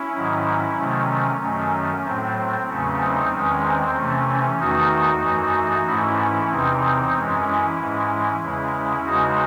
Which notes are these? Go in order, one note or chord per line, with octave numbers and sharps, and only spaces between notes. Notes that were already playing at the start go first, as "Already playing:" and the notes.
Already playing: C#4 E4
G#2 D#3 F#3
C3 D#3 F#3 A3 C#4
F#2 D#3 F#3 A3 C#4
A2 F#3 A3 C4
C4
E2 C#3 F#3 A3 C#4
C4 D#4
E2 D#3 G#3 C#4
C4
C3 E3 A3 C#4
C#4
E2 D#3 A3 D#4 F#4
F#2 E3 A3
G#2 E3 A3 C#4 E4
E2 C3 E3 C4 D#4
F#2 E3 G#3 C#4
C#4 E4
G#2 E3 G#3
E2 C#3 G#3 C#4 E4
E2 C#3 G#3 D#4 F#4